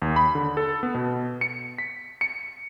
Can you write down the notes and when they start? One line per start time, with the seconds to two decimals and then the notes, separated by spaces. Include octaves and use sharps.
0.02 D#2
0.16 B5
0.35 D3
0.57 A4
0.83 B3
0.95 B2
1.41 C#7
1.78 B6
2.21 C#7